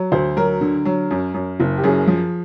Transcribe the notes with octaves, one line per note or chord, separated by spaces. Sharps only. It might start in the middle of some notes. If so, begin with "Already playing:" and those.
Already playing: F#3
D2 C5
F#3 A#4
D3
F#3
F#2
F#2
F#1
G4
F#2 G#4
F3